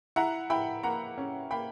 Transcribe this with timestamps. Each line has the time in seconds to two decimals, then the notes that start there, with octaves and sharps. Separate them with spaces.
0.16 E4 F#5 A#5
0.50 E4 G5 B5
0.83 A#3 F#5 A#5
1.18 C#4
1.51 A#3 G5 B5